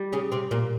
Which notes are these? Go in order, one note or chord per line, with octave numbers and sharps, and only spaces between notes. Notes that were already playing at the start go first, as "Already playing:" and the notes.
Already playing: G3
C#3 C#4
C3 C4
A#2 A#3